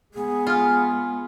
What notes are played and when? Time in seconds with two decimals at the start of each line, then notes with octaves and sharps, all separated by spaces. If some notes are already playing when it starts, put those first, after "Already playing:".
0.14 G#3 B3 G#4
0.47 F4 G#5 F6